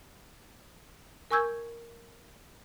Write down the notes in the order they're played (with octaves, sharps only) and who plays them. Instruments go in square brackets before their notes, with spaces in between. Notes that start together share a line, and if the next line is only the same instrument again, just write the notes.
[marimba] A#4 G#5 C#6 E6 G6 G#6